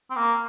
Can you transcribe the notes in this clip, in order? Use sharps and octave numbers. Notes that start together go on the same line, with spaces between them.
C4
A#3